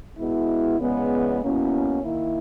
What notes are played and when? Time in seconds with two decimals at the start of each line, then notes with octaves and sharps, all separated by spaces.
0.17 B2 G#3 B3 E4
0.79 E2 C#3 G#3 B3
1.42 B2 A#3 C#4 E4
2.03 D#3 A#3 E4